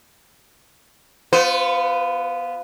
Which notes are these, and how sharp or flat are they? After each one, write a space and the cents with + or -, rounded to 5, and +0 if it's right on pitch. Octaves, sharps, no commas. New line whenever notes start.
B3 +0 F4 +0 C5 -40